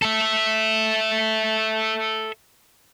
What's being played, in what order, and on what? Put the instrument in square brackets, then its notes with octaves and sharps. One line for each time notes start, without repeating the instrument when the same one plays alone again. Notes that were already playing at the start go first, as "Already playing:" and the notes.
[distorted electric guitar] A4 E5